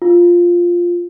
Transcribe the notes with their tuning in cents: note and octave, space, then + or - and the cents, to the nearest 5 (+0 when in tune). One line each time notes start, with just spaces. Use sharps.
F4 +0